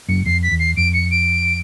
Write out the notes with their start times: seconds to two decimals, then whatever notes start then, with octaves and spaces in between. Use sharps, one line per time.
0.08 F#1 F#2 C#7
0.26 F2 C7
0.43 B6
0.51 E2
0.59 C7
0.77 F2 D7
0.93 C#7
1.11 D7